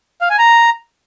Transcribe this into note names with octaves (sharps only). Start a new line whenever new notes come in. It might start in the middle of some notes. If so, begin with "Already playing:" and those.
F5
G#5
A#5